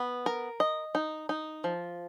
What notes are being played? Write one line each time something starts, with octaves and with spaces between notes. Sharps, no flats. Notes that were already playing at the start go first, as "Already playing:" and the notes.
Already playing: B3
A#4
D#5
D#4
D#4
F3